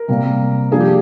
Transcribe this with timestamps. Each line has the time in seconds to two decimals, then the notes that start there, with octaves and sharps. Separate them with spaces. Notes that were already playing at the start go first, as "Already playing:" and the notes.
Already playing: A#4
0.08 C3 G3 A#3
0.71 F3 A#3 D4 G#4
0.80 G4